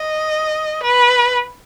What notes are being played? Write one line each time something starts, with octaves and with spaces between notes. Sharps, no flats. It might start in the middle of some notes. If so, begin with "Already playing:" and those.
Already playing: D#5
B4